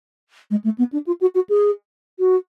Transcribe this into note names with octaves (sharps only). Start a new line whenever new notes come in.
G#3
A3
B3
D4
F4
F#4
F#4
G#4
F#4